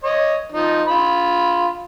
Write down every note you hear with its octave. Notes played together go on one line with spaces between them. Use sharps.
C#5 D#5
F3 D#4
F4 B5